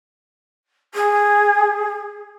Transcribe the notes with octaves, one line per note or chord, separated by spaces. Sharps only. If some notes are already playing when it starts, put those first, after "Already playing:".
G#4